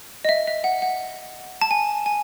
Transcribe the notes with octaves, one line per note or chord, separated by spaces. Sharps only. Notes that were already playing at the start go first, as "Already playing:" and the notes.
D#5
E5
E5
F#5
F#5
A5
G#5
G#5